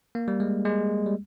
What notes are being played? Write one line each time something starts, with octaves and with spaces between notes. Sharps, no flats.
A#3
G3
G#3
G#3
G3